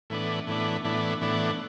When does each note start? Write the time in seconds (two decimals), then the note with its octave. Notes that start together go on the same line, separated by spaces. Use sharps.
0.10 A2 E3 B3 D4
0.47 A2 E3 B3 D4
0.84 A2 E3 B3 D4
1.21 A2 E3 B3 D4